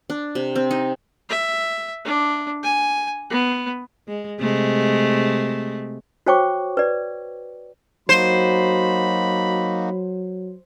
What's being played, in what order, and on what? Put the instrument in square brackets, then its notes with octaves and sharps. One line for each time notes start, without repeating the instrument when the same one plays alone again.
[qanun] D4
C3
C4
D#4
[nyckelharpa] E5
D4
G#5
B3
[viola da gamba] G#3
C3 G#3 A3
[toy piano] F#4 C5 C#5 G5 C#6 D6
B4 D5
[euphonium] F#3 [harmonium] A#3 D#4 F#4 [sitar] C5 [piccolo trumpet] B5